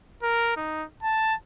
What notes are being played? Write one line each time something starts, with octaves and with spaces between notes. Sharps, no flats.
A#4
D#4
A5